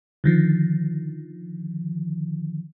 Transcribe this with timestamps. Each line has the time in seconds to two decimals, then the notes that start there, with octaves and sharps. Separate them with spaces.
0.24 D3 D#3 F3